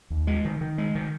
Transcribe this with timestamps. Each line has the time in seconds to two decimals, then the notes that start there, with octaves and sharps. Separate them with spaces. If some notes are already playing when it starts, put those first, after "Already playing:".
0.10 D#2
0.27 G#3
0.45 D#3
0.61 D#3
0.78 G#3
0.95 D#3